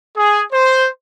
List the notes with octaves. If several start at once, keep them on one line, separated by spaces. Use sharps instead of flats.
G#4
C5